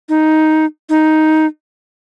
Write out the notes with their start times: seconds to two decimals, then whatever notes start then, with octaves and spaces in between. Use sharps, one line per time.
0.09 D#4
0.89 D#4